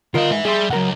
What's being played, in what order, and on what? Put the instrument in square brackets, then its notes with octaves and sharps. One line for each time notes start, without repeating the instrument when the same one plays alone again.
[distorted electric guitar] D3 F5 [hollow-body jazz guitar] F4 A#4 D#5
[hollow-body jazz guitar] G#2 [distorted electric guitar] B4 E5
[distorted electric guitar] G3 [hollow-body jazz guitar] G#4 E5 C6
[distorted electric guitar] C#2 [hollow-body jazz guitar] F#3 A#4 F#5